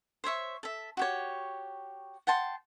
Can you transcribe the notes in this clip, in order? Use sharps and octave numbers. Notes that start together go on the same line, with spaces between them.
C5 C#5 E5 C#6
A4 E5
F#4 G4 C#5
F#5 G5 A5 C6